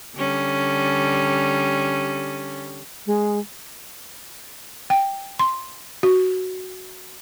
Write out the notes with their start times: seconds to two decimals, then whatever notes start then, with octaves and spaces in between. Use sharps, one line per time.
0.16 D3 G3 C#4
3.07 G#3
4.90 G5
5.39 C6
6.03 F#4